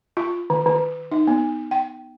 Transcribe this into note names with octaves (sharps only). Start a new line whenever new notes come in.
F4
D#3
D#3
D#4
B3
G5